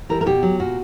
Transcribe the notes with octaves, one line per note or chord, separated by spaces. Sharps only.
E3 G3 A#4
A#4
B2 G4
F#3
A#2 F#4